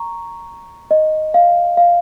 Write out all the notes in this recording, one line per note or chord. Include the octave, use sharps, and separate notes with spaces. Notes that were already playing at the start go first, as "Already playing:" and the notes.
Already playing: A#5 C#6
D#5
F5
F5